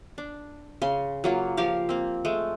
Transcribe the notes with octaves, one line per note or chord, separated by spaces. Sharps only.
D4
C#3 C6
F#3 A#3 F4
F3 G4 A#4 F5
A#3 C4
G#3 A3